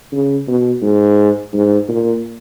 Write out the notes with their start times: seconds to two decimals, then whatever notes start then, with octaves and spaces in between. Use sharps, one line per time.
0.13 C#3
0.48 B2
0.82 G#2
1.53 G#2
1.89 A#2